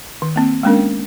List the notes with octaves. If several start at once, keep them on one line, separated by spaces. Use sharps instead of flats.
D#3
A#3 C4
G#3 A#3 B3 C#4 D4 A#4